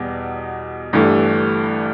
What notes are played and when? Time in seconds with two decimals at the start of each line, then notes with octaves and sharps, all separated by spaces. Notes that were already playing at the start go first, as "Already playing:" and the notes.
Already playing: E2 B2 G3
0.93 G1 G2 E3 A3